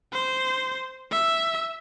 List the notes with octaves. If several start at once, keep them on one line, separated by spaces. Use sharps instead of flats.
C5
E5